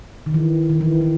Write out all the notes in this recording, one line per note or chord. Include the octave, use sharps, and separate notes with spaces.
D#3
E3
D#3
E3
E3